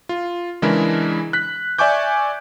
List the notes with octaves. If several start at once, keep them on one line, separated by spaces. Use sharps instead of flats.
F4
C#3 E3 G#3 D4 E4 A#4
F#6 B6
D5 E5 G#5 C#6 D6 G6